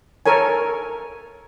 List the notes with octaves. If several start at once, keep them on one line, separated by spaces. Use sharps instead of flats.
A4 A#4 C#5 G#5